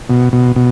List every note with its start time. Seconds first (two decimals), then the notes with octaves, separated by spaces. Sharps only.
0.10 B2
0.33 B2
0.56 B2